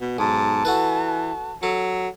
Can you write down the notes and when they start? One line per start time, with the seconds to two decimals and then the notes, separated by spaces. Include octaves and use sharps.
0.01 B2
0.18 B1 G#2 A5
0.65 E3 F#4 A4 B4
1.63 F#3 A4